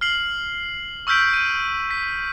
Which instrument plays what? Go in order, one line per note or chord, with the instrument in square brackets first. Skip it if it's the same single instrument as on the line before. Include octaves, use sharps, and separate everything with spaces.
[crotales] F6 C7 F#7
C#6 E6 F6 G6 B6 D7
D#7
B6